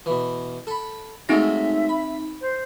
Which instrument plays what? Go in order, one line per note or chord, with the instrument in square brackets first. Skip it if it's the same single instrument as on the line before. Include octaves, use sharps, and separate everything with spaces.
[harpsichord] B2 E3
A4 B5
[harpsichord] F#3 G#3 A3 [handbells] C4 D#4 A#6 [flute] E5
[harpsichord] B5
[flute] C5